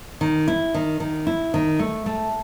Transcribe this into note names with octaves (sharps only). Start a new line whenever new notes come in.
D#3
E4
D#3
D#3
E4
D#3
A3
A3